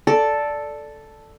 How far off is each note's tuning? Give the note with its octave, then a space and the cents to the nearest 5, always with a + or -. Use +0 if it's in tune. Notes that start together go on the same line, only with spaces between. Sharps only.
A4 +0 D5 +0